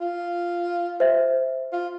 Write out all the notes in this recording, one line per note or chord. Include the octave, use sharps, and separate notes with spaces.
F4
C5 E5
F4